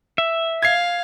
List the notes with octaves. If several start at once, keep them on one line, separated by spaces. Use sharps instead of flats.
E5
F5 G#6 C7